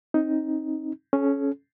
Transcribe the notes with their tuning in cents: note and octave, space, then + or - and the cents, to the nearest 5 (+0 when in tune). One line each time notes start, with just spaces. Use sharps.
C4 +35 D#4 +10
C#4 +0 A4 -45